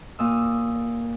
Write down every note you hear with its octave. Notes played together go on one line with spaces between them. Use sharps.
A#2 D#6 E6